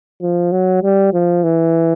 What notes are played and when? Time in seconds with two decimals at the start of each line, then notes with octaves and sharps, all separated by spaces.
0.22 F3
0.52 F#3
0.83 G3
1.13 F3
1.44 E3